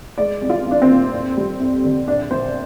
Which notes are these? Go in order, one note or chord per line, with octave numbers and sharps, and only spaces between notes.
G#3 D5
C2
F4
C2
D4
C4
A#2
F2
G3
F2
D3
A#1 D4
A#1 C5